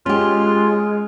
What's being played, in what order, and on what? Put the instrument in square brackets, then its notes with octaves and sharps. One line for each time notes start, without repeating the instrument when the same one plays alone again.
[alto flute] G#3 [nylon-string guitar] C#4 G4 [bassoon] F4